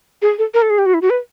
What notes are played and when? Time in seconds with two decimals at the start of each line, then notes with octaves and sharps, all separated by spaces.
0.22 G#4
0.38 A4
0.54 A#4
0.62 A4
0.70 G#4
0.78 G4
0.86 F#4
0.94 E4
1.02 F#4
1.10 B4